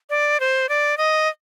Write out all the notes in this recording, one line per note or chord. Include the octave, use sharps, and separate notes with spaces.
D5
C5
D5
D#5